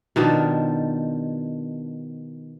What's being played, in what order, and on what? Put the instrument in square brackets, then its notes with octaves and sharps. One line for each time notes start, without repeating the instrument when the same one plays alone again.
[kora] B2 D#3 F3 D4